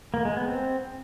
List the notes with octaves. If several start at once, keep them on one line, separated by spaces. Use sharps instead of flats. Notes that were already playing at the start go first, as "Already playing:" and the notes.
A#3
G#3
B3
C4